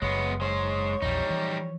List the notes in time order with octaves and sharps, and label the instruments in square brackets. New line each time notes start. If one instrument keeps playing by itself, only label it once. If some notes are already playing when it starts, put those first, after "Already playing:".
[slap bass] F#1 F#2 [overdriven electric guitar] G#3 B3 [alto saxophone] C#5
[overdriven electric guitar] G#3 C5 [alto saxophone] C#5
[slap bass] A#1 E2 [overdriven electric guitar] G3 D#4
[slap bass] E3 F3